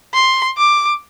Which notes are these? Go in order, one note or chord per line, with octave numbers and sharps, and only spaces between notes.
C6
D6